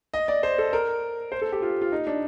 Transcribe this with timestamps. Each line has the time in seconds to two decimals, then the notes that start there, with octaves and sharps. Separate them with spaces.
0.14 D#5
0.28 D5
0.43 C5
0.58 A4
0.73 A#4
1.32 C5
1.42 A4
1.52 G4
1.62 F4
1.82 F4
1.92 D#4
2.07 D4